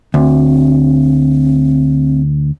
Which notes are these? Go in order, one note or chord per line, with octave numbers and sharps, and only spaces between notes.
D2 C4